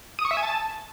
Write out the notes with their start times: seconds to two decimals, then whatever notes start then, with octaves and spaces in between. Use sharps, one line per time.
0.19 D#6
0.25 C#6
0.31 E5
0.37 G#5
0.43 A5